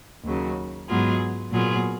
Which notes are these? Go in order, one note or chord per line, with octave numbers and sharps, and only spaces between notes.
D#2 C#3 F#3
G#2 F#3 B3 F4 G#4
A#2 F#3 B3 F4 G#4